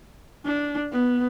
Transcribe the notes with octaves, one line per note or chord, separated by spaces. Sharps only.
D4
B3